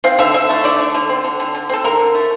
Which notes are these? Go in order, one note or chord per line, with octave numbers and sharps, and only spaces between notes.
C4 F5
D3 E5
D3 E5
A3 E5
D3 D5
D3
D3
C4
D3
D3
D3
C4 A4
D3 A#4
D3
A3